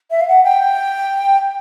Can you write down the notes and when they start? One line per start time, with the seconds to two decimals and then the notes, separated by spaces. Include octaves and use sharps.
0.11 E5
0.21 F5
0.28 F#5
0.44 G5